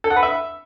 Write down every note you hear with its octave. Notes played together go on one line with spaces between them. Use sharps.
A4
F#5
B4
E5